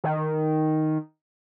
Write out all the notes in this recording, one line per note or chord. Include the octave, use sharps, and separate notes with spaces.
D#3